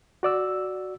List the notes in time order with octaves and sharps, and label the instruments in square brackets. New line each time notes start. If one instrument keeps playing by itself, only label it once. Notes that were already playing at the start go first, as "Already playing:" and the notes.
[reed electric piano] F#4 D5 E6